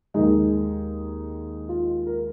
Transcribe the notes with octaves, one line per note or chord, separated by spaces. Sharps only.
D#2 D#3 G#3 D#4
F4
A#4